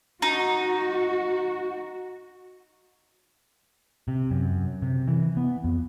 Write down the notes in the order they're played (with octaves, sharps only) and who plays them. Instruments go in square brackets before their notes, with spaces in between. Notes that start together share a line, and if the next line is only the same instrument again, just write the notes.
[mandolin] D#4 [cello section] F#4
[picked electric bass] C3
F#2
C3
E3
B3
F2